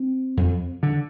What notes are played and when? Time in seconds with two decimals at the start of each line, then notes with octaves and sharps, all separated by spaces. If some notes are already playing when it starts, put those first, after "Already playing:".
Already playing: C4
0.37 F2
0.83 D3